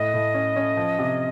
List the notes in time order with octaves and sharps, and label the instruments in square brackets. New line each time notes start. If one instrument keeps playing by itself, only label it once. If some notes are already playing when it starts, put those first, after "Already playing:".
Already playing: [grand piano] A2 [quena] D#5
[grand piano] A2
C#4
C#4
F3
C3